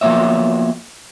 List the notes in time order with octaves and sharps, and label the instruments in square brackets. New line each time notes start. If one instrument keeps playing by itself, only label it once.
[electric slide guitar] F3 F#3 A#3 B3 C#5 E5